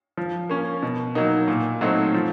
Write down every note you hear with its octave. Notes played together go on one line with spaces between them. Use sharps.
F3
A#3 C#4
B2
F#3 A#3 D#4
A#2
F#3 A3 C4 D#4
F3